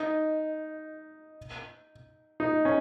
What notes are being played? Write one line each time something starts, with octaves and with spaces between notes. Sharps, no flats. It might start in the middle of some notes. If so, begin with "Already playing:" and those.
Already playing: D#4
D#4
C#4